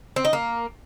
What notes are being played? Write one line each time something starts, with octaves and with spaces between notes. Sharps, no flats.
C4
D#4
A#3